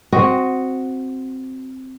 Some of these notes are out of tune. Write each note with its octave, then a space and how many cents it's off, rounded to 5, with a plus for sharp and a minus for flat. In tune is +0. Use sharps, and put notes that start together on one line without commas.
C4 +0 F#4 +0 D#5 +0